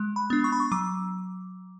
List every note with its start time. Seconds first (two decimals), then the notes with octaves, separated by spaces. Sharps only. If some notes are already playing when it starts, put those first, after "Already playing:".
Already playing: G#3
0.16 B5
0.30 B3 D4
0.44 C#6
0.52 B5
0.60 C#6
0.72 F#3 D6